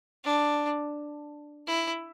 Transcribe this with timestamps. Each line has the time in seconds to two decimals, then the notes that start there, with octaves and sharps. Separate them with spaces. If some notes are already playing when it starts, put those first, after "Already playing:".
0.24 D4
1.67 E4